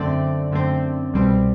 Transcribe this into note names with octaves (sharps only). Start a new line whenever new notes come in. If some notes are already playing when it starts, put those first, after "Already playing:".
Already playing: F#2 D3 A3 C4 D5
F#2 D3 A3 C4
C2 B2 G3 C4